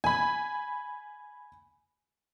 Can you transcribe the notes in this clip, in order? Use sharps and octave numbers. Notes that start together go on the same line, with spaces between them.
G#5 B5